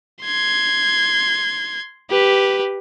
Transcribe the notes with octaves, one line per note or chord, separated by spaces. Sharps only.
C6 G#6
G4 B4